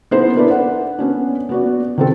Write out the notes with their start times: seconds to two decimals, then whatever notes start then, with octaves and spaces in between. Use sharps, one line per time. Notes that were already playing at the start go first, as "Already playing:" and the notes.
0.11 B3 D#4 E4 A4 C5
0.35 B3 D4 E4 A#4 B4 D5
0.50 F#5
0.99 B3 C#4 D4
1.49 B3 F#4 D5
1.98 D#3 C4 A4